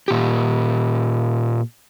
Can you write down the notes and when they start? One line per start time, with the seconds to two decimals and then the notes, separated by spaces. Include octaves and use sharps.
0.08 A#2 G4